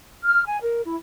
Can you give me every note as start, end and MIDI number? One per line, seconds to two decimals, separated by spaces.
0.25 0.45 89
0.45 0.57 80
0.62 0.81 70
0.84 0.96 64